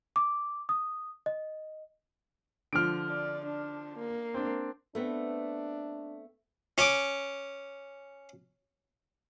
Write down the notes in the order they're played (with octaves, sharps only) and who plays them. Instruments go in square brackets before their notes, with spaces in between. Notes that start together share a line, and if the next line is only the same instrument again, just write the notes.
[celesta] D6
D#6
D#5
[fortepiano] D3 F3 [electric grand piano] F6 D7
[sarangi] D5
D4
A#3
[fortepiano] C4 D4
[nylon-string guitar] A3 B3 C4 [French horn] D4
[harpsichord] C#4 D6